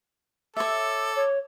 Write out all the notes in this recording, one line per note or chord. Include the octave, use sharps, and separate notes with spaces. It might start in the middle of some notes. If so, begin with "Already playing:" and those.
A4 C#5 E5 D6
C#5